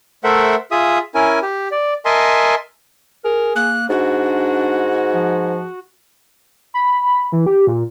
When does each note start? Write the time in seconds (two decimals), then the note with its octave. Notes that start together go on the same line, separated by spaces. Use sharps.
0.24 A3 A4 A#4 C5 E5 F#5
0.71 F4 G#4 E5 D#6
1.15 C#4 E4 A#4 G#5
1.42 G4
1.72 D5
2.05 A#4 D#5 E5 G#5 A5 C6
3.25 G#4 A#4
3.56 A#3 F#6
3.89 G#2 D4 F#4
5.14 F3
6.74 B5
7.32 E3
7.46 G4
7.67 A#2